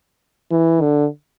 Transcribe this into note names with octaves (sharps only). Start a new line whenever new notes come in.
E3
D3